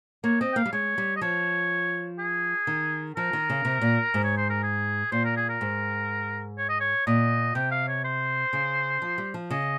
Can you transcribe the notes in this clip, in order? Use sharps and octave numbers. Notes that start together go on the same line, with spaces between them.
A#3 C#5
C4 D#5
G5
A#3 F5
G3
G#3 C#5
G3
D#5
F3 C#5
G#4
D#3
F3 A#4
D#3
C#3
C3
A#2
G#2
C#5
C5
A#4
G#4
A#2 C5
A#4
G#4
A#4
G#2
C#5
D#5
C#5
A#2 D#5
C3 G5
F5
C#5
C5
C#3
F3
G3
F3
C#3 D#5